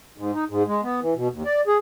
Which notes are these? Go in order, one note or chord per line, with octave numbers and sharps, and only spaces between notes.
G#2
D#4
G#2
G#3
B3
E3
B2
D#2
D5
G#4